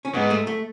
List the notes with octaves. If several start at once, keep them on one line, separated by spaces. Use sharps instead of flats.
C#4
G#2 G#3 B3
A3
A3